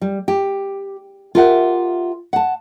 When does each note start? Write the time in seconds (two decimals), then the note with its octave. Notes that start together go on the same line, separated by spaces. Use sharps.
0.01 G3
0.28 G4
1.35 F4 G4 A#4 E5 F#5
2.33 F#5 A5